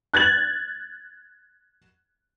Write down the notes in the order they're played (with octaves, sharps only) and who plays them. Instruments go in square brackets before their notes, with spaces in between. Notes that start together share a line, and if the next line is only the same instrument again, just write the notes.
[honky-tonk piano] F#6 G#6 A6 F#7